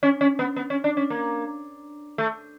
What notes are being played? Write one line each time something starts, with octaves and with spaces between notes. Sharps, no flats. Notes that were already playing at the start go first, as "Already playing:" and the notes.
C#4
C#4
B3
B3
C#4
D4
C#4
A#3
A3